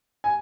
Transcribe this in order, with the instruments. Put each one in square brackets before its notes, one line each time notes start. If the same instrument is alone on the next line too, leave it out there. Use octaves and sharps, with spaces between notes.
[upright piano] G#5